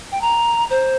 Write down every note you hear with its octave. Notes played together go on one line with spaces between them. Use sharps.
G5
A#5
C5